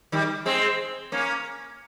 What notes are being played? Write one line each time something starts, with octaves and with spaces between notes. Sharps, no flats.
D#3 G3
G#3 C4
A#3 C#4